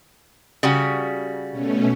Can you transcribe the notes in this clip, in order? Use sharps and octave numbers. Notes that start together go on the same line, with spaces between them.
C#3 G3 F#4
B2 A3 C#4